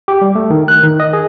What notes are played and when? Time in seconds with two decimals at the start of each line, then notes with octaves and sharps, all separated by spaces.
0.08 G4
0.22 G3
0.35 A3
0.50 D#3
0.68 F#6
0.83 D#3
1.00 D#5
1.13 G#4